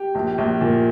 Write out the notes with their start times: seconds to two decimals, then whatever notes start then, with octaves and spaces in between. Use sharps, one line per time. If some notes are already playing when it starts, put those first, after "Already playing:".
Already playing: G4
0.15 A#1
0.38 A#1
0.61 A#2